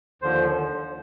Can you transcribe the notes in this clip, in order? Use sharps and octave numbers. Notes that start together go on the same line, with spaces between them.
D#2 D3 F3 C5